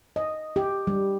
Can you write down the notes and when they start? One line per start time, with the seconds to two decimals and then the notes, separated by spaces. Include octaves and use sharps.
0.16 D#5
0.56 G4
0.87 G3